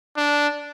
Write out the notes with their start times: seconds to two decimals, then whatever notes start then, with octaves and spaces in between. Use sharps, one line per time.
0.17 D4